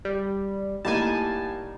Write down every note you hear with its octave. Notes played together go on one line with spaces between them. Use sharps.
G3
A2 G3 A#3 D#4 G#5 A5